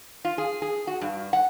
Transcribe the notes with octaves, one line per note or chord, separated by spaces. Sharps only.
F4
G#4
G#4
F#4
G2
F#5